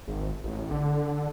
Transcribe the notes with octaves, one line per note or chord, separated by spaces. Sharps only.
G#1
A1
D3